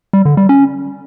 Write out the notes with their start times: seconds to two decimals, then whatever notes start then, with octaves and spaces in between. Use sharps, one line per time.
0.13 G3
0.25 D3
0.37 G3
0.49 C#4